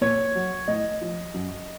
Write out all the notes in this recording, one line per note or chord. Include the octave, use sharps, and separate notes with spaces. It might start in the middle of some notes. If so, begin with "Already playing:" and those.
A#2 C#5
F#3
A2 D#5
F3
F#2